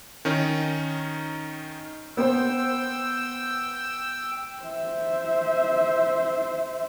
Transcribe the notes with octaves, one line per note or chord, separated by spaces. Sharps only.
D#3 C#4 D#4
B3 C5 G5 E6
C5 E5